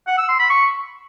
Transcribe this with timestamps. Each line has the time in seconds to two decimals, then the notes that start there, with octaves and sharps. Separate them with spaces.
0.07 F#5
0.18 E6
0.29 C6
0.39 B5
0.50 C#6